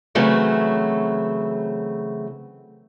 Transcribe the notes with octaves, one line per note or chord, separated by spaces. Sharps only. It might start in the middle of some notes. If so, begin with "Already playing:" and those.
C#3 E3 F#3 A3 C4